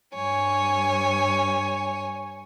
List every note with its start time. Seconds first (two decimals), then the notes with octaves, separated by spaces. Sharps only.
0.13 G2 C#5 G#5